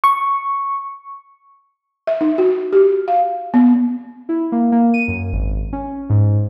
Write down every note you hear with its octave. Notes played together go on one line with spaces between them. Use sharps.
C#6
E5
D#4
F#4
G4
F5
B3
E4
A#3
A#3
D#7
F#2
G#1
C#4
G#2